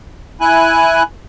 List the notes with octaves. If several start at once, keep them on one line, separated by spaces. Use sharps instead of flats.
E4 G#5 F#6